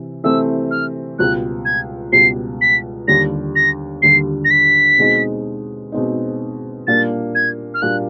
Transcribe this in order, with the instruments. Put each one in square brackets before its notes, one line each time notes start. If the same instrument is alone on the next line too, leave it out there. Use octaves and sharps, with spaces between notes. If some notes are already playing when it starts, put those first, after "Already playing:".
Already playing: [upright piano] C3 E3
[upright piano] C3 E3 A3 C4 [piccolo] E6
[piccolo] F6
[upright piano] C#2 B2 G3 [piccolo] F#6
[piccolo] G#6
[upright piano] C#2 B2 G3 [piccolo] C7
[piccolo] B6
[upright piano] D#2 D3 G3 [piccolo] A#6
[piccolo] A#6
[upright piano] D#2 D3 G3 [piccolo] C7
[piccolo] A#6
B6
[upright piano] B2 G#3 C4 D#4
B2 G#3 C4 D#4
[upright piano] A#2 G3 A#3 D4 [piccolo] A6
[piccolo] G#6
F6
[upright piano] A#2 G3 A#3 D4 [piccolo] F#6